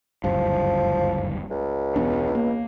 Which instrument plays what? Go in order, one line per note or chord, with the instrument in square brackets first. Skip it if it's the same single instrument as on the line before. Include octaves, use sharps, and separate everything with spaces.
[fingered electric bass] F#1 D2 G2 [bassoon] F3
[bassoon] C#2
[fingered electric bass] E1 B3 D4
A#3